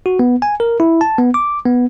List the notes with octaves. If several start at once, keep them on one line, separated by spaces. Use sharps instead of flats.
F#4
B3
G#5
A#4
E4
A5
B3
D6
B3